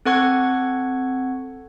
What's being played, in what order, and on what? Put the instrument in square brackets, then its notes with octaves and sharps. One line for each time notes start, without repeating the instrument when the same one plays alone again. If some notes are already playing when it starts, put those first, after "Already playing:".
[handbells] C4 A4 F#5 C#6 G#6